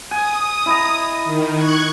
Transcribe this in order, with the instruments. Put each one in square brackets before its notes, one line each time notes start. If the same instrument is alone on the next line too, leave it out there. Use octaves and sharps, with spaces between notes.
[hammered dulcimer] G#5 [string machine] D#6
[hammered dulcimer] E4 D#5 A#5
[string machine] D#3
C#6 F#6 G#6